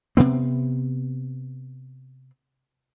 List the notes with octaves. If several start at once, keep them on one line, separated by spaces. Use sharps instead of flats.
C3 B3 C4